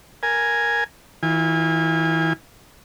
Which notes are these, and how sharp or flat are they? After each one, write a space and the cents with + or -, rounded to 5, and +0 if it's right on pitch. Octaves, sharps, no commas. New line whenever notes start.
A#4 +0 G#5 +0
E3 -30 F4 +0 G#5 -30